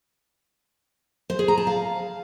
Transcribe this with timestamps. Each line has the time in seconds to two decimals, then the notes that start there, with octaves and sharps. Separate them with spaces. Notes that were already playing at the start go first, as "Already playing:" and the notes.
1.30 C5
1.39 G#4
1.48 A#5
1.57 A5
1.67 F5